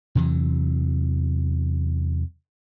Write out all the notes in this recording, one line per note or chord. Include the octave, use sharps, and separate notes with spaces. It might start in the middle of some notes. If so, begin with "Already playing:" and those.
E2 C3 E3 F#3